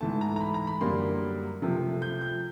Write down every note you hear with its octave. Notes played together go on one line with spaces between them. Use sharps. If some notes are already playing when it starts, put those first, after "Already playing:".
G#2 E3 A3 A5
A#5
A#5
B5
A#5
B5
F#2 D3 G3 A#3 C6
C3 F3 A3
G6
G6